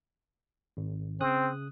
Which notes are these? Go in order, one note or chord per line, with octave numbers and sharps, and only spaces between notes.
G#1
C#3 C4 D#6 F#6